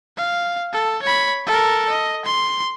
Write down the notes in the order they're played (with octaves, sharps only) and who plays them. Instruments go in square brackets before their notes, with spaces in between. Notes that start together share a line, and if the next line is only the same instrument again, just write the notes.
[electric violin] F5
A4
C#5 B5
A4 A#4
D#5
C6